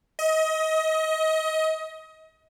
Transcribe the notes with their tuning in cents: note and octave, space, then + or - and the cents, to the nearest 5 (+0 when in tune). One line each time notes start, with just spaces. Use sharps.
D#5 +30